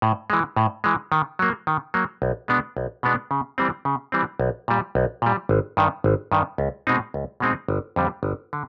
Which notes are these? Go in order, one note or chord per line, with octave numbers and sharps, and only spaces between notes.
A2
E3 G#3
A2
E3 G#3
D#3
F#3 A#3
D#3
F#3 A#3
B1
B2 G#3 B3 D4
B1
B2 G#3 B3 D4
C#3
E3 G3 C4
C#3
E3 G3 C4
B1
A#2 G3
B1
A#2 G3
G#1
G2 D#3
G#1
G2 D#3
C#2
B2 G#3 C4 D#4
C#2
B2 G#3 C4 D#4
G1
F2 D3 G3
G1
D3